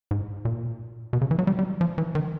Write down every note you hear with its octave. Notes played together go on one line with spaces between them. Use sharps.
G#2
A#2
B2
C#3
E3
F#3
G3
G3
F3
E3
D#3